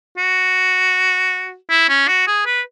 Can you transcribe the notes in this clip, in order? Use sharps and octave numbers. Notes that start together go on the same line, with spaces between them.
F#4
E4
C#4
F#4
G#4
B4